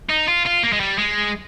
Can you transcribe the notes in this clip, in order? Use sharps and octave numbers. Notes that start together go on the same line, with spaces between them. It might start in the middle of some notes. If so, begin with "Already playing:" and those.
D#4
F4
F4
A#3
G#3
G3
G#3